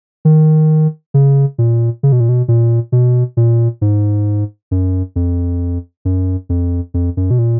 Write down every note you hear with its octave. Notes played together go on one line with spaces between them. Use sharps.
D#3
C#3
A#2
C#3
B2
A#2
B2
A#2
B2
A#2
G#2
F#2
F2
F#2
F2
F2
F#2
B2
A#2